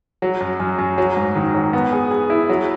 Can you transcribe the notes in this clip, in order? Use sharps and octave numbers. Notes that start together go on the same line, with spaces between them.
F#3
F#2
F#2
F#2
F#3
G#2
D#3
F#3
B3
G#4
G#4
E4
F#3